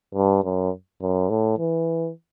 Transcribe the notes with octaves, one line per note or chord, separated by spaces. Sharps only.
G2
F#2
F#2
A2
E3